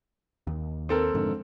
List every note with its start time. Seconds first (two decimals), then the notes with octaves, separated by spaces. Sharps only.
0.47 D#2
0.89 C4 A4 A#4
1.14 F2 G#2 D3